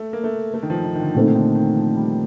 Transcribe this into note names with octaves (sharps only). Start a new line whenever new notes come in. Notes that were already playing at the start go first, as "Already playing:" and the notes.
Already playing: A3
A#3
A3
A3
D#3
F3
D#3
D#3
D3
A#2 D3 A3 C4 D#4
D#3
D3
D#3
F3
G3